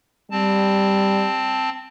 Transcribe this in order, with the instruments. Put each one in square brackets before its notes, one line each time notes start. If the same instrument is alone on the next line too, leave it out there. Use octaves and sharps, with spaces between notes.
[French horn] G3 [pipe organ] C4 A5